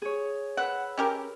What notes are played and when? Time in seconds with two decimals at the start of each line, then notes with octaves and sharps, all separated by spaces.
0.02 G#4 C#5
0.57 B4 F#5 E6
0.98 C#4 G4 A#4